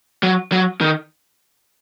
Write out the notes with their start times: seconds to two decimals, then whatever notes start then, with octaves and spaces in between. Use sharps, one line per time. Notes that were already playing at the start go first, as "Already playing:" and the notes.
0.23 F#3
0.52 F#3
0.81 D#3